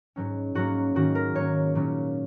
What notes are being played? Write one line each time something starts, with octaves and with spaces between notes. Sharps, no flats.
G#2 F#3 C#4
G#2 F#3 A#3 C#4 F#4
G#2 D#3 A#3 C#4 F#4
A#4
G#2 F#3 A#3 C#4 C#5
A#2 F#3 C#4